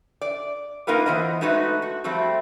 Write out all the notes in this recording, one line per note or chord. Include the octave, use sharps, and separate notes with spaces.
D5
A#3 D#4 F4 A#4 B4
E3 B3 C5 D#5
G#3 A3 D#4 F#4 B4
F#4
F3 G3 A3 C4 F#4